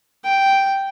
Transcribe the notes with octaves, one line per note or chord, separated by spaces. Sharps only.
G5